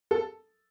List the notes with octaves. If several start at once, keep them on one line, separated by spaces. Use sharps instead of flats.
A4